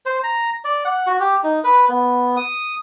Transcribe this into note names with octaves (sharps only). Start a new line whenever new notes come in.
C5
A#5
D5
F#5
F#4
G4
D#4
B4
B3
D#6